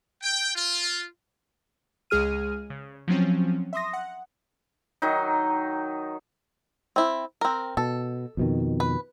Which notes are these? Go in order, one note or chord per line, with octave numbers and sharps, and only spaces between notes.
G5
F4
C#2 G#3 G#4 F6 D#7
C#3
F3 F#3 C4 C#4
E5 C6 D#6 A#6
F#5
D#3 F#3 D#4
C4 E4
C4 A#4
B2 A4
F2 B2 D#3
B4